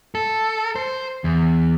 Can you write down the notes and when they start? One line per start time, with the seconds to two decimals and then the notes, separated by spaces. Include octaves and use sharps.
0.15 A4
0.76 C5
1.24 E2